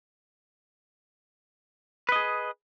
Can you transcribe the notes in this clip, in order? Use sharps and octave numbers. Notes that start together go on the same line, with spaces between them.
G#4 B4 D#5